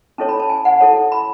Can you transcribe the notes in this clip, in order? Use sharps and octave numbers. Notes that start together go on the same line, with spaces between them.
C#4 E4 A4 C#5 A5
B5
A5
G#5
F#5
E4 A4 C#5 A5
B5